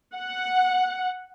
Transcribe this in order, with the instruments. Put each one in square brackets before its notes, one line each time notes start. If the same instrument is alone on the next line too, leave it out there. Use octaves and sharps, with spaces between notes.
[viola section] F#5